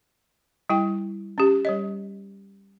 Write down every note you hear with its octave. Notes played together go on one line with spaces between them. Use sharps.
G3 E4 G5
C#4 G4
G3 C#5 D#5